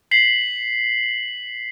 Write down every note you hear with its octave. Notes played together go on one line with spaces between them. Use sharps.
B6 C7 F#7